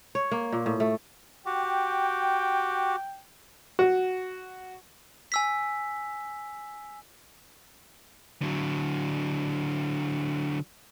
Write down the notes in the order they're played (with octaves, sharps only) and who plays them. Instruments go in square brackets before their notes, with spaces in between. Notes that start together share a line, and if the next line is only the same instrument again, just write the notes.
[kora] C#5
A#3
A#2
A2
A3
[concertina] F#4 G4 [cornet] G5
[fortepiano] F#4
[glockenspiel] G#5 E6 B6
[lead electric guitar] D3 F#3